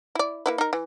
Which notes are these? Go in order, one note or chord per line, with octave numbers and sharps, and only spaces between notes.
E4 D5
A#3 E4 B4
D#4 A#4
E3